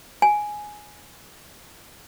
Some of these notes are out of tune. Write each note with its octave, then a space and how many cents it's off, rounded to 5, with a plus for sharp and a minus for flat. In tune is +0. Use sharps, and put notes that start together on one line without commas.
G#5 +5